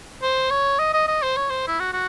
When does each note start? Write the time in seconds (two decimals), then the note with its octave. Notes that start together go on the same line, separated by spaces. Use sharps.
0.23 C5
0.50 C#5
0.79 D#5
0.94 D#5
1.08 D#5
1.22 C5
1.36 C#5
1.50 C5
1.67 E4
1.80 F#4
1.93 F#4